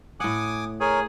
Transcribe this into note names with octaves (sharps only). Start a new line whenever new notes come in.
A2 F#5 G#5 D6 D#6
G#4 A#4 C#5 G#5